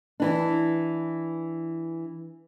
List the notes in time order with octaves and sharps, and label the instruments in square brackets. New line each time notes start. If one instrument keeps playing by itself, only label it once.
[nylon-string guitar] E3 D4